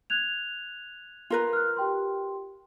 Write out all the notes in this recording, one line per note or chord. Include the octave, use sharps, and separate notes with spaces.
F#6 G#6 F7
F4 A#4 B4
F6 F#6
G4 G5 C6